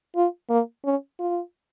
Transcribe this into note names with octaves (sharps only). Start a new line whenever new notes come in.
F4
A#3
C#4
F4